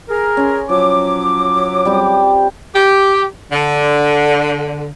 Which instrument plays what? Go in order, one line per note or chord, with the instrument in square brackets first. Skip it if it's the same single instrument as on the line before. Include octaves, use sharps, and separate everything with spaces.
[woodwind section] G#4 A#4
[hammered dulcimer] C#4 C6
[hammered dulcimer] F3 [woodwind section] F#3 D6
[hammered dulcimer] G3 C4 G4
[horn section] G4
D3